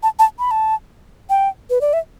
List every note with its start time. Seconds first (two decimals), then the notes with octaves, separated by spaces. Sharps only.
0.03 A5
0.19 A5
0.39 B5
0.51 A5
1.30 G5
1.70 B4
1.81 D5
1.93 E5